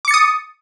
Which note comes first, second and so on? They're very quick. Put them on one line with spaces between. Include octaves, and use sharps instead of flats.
D6 C#7 A6 D#6